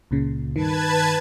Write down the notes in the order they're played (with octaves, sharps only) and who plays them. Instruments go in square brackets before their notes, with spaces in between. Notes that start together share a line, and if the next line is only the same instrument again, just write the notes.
[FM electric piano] C#2 A#2 C#3
[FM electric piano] G2 D#3 [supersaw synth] B4 A5 G#6